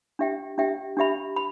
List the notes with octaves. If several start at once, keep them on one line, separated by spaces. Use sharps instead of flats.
D4 G4 E5 G5
D4 G4 E5 G5
D4 G4 E5 B5
B5